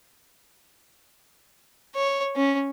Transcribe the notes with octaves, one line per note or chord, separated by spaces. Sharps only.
C#5
C#4